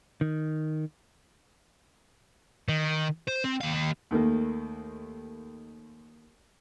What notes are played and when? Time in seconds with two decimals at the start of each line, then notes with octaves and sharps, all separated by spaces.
0.21 D#3
2.69 D#3
3.28 C5
3.45 C4
3.61 D#2 F5
4.11 D#2 D#3 A3 A#3